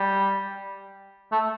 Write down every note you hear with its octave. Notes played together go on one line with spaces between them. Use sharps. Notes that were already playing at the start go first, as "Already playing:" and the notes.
Already playing: G3
A3